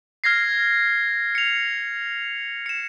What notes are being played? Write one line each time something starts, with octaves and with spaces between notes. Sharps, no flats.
F6 G#6 A#6 C7
C#7 F7
C#7 E7